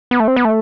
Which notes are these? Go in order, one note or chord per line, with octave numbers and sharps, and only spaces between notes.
B3
A3
C4
B3
A3